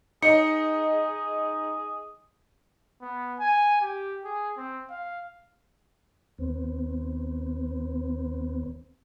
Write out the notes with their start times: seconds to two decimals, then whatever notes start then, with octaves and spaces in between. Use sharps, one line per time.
0.22 D#4 G#4 D#5 C#7
3.02 B3
3.39 G#5
3.82 G4
4.25 G#4
4.57 C4
4.90 F5
6.38 D#2 B3 C4